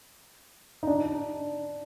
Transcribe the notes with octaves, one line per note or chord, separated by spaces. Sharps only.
D#4
D4